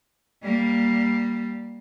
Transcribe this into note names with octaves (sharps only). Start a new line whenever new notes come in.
G3 A#3